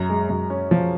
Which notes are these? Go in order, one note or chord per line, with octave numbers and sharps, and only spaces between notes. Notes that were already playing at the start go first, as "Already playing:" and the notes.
Already playing: F#2 A#5
G#3
F#2
C#4
F3